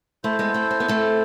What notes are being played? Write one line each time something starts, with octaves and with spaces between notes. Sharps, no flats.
A3 E4 A4 C5
G#3 B3
A3 C4
C4
B3
A3 C4